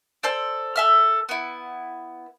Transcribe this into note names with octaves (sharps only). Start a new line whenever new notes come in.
A4 C5 D5
A4 E5 F6
B3 E4